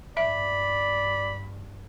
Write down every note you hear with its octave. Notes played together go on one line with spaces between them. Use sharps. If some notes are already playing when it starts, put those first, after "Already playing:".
G2 D5 E5 B5